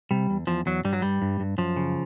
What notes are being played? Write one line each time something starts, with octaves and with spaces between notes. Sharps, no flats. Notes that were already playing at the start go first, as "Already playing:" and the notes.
C3 G3
E2
E2 F3
E2 F#3
G2 G3
F#3
G2 G3
G2
G2
F#2 F3
C#3